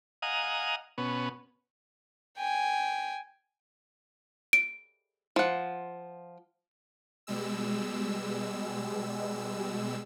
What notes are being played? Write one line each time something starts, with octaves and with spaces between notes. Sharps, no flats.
D#5 F5 F#5 G#5 A#5 D#6
B2 B3 C#4
G5 G#5
D7
F3 F#5
B2 G3 G#3 E6